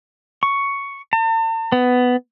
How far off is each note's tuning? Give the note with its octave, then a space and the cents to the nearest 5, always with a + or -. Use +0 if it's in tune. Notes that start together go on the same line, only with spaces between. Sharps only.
C#6 +5
A5 +45
B3 +10